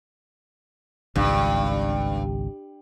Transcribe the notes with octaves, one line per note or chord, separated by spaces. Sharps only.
G#1 C#2 G2